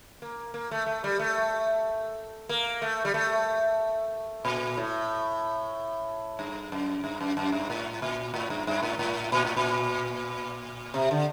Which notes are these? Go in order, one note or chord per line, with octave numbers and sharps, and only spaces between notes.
A#3
A#3
A3
A3
G3
A3
A#3
A3
G3
A3
A#2
A2
G2
F#2
G2
F#2
F#2
G2
A2
A#2
A2
G2
G2
A2
A2
A#2
A2
A#2
C3
D3